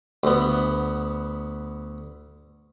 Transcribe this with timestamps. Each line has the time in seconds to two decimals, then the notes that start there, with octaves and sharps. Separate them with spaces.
0.24 D2 B3